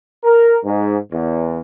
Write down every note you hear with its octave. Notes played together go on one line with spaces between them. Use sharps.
A#4
G#2
E2